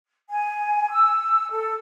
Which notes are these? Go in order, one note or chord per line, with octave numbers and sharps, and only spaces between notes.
G#5
E6
A4